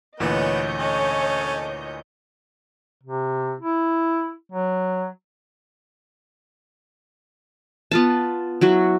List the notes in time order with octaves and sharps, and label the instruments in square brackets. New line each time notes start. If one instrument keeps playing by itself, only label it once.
[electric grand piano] D2 A#2 E3 [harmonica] B3 [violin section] C#5 D#5 G6
[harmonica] C#4 A4
[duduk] C3
E4
F#3
[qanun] B3 F4 A5
F#3 E4 F#4